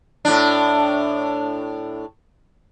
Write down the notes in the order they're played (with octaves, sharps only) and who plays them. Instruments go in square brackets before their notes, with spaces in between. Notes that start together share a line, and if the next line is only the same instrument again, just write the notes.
[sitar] A2 D4